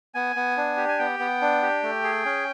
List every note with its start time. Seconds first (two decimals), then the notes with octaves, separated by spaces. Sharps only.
0.14 B3 G#5
0.36 B3
0.57 D4
0.77 G4
0.88 G#5
0.98 B3 G5
1.19 B3
1.41 D4
1.62 G4
1.83 A3
2.04 G#4
2.25 C#4